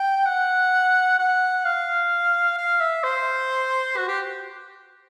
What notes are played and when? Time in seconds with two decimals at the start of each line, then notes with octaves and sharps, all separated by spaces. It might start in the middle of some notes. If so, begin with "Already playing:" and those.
Already playing: G5
0.26 F#5
1.19 F#5
1.65 F5
2.58 F5
2.81 E5
3.04 C5
3.97 F#4
4.08 G4